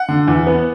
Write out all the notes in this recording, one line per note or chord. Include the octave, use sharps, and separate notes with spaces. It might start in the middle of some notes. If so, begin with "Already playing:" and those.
Already playing: F#5
D3
E2
B3